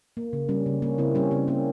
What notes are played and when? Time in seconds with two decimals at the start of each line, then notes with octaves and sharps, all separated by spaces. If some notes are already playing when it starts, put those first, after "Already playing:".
0.17 A#3
0.33 C#3
0.49 G3 C#4
0.66 C#3
0.82 A#3 C#4
0.98 C#3 C4 E4
1.15 G3 C#4
1.31 C#3 C4
1.48 A#3 C#4